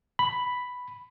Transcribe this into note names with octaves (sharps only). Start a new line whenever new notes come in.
B5